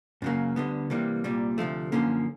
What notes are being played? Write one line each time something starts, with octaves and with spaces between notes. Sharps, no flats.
F#2 C#3 F#3 A#3
D2 D3 G3 B3
C3 E3 G3 A#3
C2 A#2 G3
D2 C3 F3 A3
F#2 D3 F3 A#3 C#4